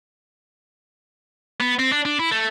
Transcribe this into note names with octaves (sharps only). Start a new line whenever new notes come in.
B3
C4
D4
D4
E4
A3